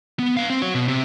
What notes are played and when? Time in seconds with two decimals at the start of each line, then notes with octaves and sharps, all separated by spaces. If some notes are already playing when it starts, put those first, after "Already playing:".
0.19 B3
0.37 B4 F5
0.50 C4
0.62 F#4 C#5
0.74 B2
0.88 C3